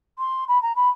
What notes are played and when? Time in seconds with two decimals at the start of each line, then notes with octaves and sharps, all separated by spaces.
0.18 C6
0.48 B5
0.62 A#5
0.75 B5